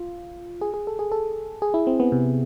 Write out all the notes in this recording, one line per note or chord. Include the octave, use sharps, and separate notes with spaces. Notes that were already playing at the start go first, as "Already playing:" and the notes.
Already playing: F4
G#4
G#4
A4
G#4
A4
G#4
E4
C4
B3
C3